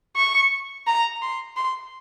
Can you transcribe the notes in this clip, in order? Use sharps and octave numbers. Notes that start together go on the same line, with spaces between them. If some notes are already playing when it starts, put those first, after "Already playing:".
C#6
A#5
C6
C6